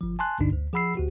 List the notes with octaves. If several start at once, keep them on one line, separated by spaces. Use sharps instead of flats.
G1 F3
G#5 A5 C6 F#6
G#1 C#2 G2 D3 D4 D#4
D2
F3 G#4 F#5 B5 E6 C7
D2 F#4 G4